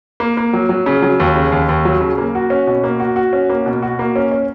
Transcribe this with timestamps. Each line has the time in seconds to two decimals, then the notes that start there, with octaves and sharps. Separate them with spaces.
0.20 A#3
0.37 A#3
0.53 F#3
0.69 F#3
0.86 C#3
1.02 F#3
1.20 D#2
1.35 C#3
1.52 D#2
1.69 D#2
1.85 F#3
2.01 C#3
2.18 A#3
2.35 F#4
2.50 C#4
2.67 B2
2.84 A#3
3.00 F#4
3.16 F#4
3.33 C#4
3.49 A#3
3.66 B2
3.82 F#4
3.99 A#3
4.16 C#4
4.31 C#4